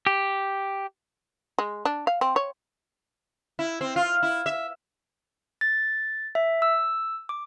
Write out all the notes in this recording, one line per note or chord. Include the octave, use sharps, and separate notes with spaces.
G4
G#3
D4
F5
C4
C#5
E4
C4
F4
E4
E5
A6
E5
E6
D6